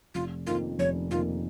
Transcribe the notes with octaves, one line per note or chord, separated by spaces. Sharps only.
F1 F4
F2 D#3 A#3 F4
F1 C#5
F2 D#3 A#3 F4